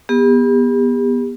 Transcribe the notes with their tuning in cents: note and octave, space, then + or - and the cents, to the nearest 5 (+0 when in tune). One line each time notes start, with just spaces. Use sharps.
B3 -20 G4 +40